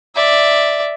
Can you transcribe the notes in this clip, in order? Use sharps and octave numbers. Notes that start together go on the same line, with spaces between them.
D5 E5